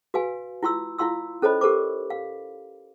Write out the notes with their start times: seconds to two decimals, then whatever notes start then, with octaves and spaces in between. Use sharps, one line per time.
0.14 F#4 B4 F5 G#5
0.63 E4 F4 C6 E6
0.99 E4 F4 F5 C6 E6
1.42 C#4 A4 C5 C#5 D#5 B5
1.61 G4 A4 A#4 C5 D6
2.10 F5